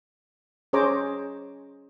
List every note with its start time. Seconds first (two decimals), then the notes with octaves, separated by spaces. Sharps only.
0.73 C#4 G#4 C5 C#5 A#5 D6